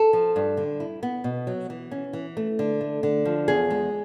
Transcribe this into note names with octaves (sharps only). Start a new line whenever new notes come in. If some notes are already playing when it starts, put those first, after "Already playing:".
Already playing: A4
F3
G2
D3
E4
B3
B2
F#3
E3
C#4
E3
A3
D3
A3
D3
F3
E2 G#4
G#3